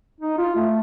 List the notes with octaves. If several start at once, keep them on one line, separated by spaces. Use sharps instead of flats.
D#4
F4
A3